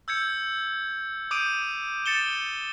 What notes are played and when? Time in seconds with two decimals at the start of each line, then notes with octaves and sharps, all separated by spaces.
0.08 E6 G6 G#6 C#7
1.31 D6 D#6 G6 D7 D#7
2.06 A6 C#7 E7 G7